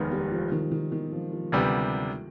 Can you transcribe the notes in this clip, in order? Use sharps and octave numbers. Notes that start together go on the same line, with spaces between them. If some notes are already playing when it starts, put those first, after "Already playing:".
Already playing: F1 D#2 D#3 G#3 B3
G3
F3
D#3
D#3
D#3
F3
F3
D2 C3 G3 B3